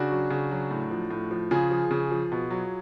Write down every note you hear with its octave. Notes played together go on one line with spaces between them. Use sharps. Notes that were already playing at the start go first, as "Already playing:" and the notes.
Already playing: C#3 D4 F#4
F#3
C#3
F#3
A2
F3
A2
F3
C#3 F4 G#4
F3
C#3
F3
B2
F#3